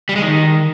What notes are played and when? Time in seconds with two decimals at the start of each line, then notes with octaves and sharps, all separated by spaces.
0.09 G3
0.16 G#3
0.22 D#3